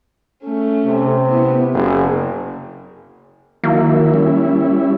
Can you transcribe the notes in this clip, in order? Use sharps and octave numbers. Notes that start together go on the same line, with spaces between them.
A3 C#4
C3
B3 E4
F#1 G#4
D#3 F#3 A#3 E4
G3 C#4 E4